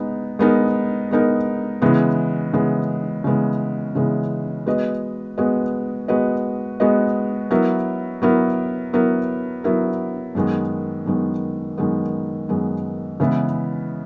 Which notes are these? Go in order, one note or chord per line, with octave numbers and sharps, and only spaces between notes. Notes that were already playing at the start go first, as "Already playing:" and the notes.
Already playing: G#3 B3 D#4
G#3 B3 D#4 A#4
G#3 B3 D#4 A#4
C#3 E3 G#3 B3
C#3 E3 G#3 B3
C#3 E3 G#3 B3
C#3 E3 G#3 B3
G#3 B3 F#4 B4 D#5
G#3 B3 F#4 B4 D#5
G#3 B3 F#4 B4 D#5
G#3 B3 F#4 B4 D#5
F#3 B3 E4 A#4
F#3 B3 E4 A#4
F#3 B3 E4 A#4
F#3 B3 E4 A#4
F#2 D#3 G#3 B3
F#2 D#3 G#3 B3
F#2 D#3 G#3 B3
F#2 D#3 G#3 B3
C#3 E3 G#3 B3 E4